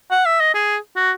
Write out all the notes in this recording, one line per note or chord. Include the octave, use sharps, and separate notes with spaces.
F#5
E5
D#5
G#4
F#4